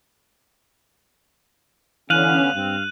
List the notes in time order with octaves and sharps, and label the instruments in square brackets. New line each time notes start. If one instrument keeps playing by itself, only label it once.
[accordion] D3 B3 C#4 [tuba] E3 [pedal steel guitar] F5 [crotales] F#6 D#7 F#7
[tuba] G2 [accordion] C4